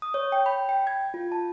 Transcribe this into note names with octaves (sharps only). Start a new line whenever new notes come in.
D#6
C#5
G5
B5
G5
G#6
F4
A5